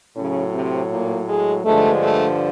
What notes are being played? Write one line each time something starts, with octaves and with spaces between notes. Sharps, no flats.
A2 C#3 F#3 C#4
C3 C4
A#2 A#3
G#3
G2 D3 F3 G#3 A3
A3